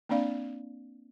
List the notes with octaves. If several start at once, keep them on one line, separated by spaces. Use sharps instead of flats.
A#3 C4 D4 D5 F5